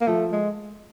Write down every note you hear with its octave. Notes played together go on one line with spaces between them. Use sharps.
A#3
F3 A3
G#3